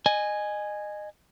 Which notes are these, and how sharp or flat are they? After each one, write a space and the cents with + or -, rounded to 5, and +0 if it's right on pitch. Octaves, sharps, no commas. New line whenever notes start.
D#5 -25 G#5 +0